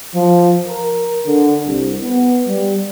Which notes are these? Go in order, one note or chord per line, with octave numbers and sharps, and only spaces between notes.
F3
A#4
D3
C2
B3
G3